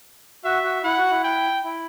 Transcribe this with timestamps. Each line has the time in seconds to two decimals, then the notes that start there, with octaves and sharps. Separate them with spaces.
0.44 F#4 E5
0.64 F#4
0.84 E4 F#5
0.98 F#4
1.11 E4
1.24 G5
1.64 E4